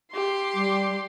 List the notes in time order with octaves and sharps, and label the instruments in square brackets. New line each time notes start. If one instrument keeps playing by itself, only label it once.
[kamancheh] G4 C6
[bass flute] G3